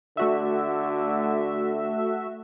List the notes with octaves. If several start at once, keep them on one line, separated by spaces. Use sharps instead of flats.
D3 A3 F#4 E5